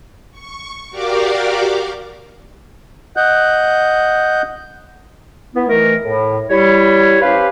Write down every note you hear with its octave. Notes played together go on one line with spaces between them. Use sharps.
C#6
F#4 G4 A#4 D5 F5 D6
D#5 F#5 F#6 G6
B3 E4
D#3 E3 A3 A#4
A2
G3 E4 C#5
C#4 G4 B4 C5 F5 B5